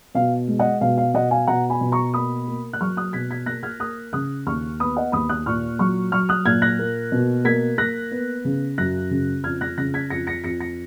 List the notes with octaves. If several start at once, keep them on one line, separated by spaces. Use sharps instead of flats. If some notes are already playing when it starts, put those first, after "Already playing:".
B2 F5
G#3
D#5 F#5
B2 F5
F5
B2 D#5 F#5
F5 G#5
B2 F#5 A#5
G#5 B5
B2
A#5 C#6
A#3 B5 D#6
A#3
F#6
F#3 C#6 F6
D#6 F#6
B2 G#6 B6
G#6 B6
A#3 F#6 A#6
F6 G#6
A#3 D#6 F#6
C#3 D#6 F#6
D#2 C#6 F6
B3 B5 D#6
D#5 F#5
D#2 B5 D#6
D#6 F#6
A#2 C#6 F6
F#3 C#6 F6
F#3 C#6 F6
D#6 F#6
A#2 F6 G#6
F#6 A#6
A#3
B2
A#3 G#6 B6
A#3 F#6 A#6
B3
C#3
F#2 F#6 A#6
C#3
F2 F6 G#6
F#6 A#6
C#3 F#6 A#6
G#6 B6
F2 A#6 C#7
A#6 C#7
F2 A#6 C#7
A#6 C#7